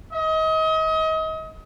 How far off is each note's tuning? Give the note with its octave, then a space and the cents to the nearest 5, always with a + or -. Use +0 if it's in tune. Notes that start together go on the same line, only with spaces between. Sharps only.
D#5 +30